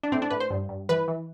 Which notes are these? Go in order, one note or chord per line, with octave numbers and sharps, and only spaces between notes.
D4
A2 C4
D4
A2 B4
C5
G2
G2
E3 B4
E3